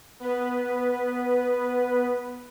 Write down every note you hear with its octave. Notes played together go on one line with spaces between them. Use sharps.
B3 B4